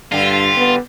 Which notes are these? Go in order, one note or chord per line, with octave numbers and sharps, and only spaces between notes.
G2 D3 G3 F4
B3